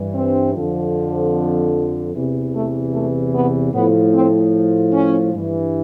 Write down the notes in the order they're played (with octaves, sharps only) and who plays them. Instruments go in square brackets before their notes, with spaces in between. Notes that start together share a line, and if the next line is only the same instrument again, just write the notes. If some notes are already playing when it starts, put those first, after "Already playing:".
Already playing: [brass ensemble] G2 E3
C4
F2 D3 F3
E2 C3 E3
A3
A3
B3
A2 F3 B3
C4
C#4
G2 E3